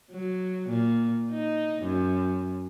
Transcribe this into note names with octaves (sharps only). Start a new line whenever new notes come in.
F#3
A#2
D#4
F#2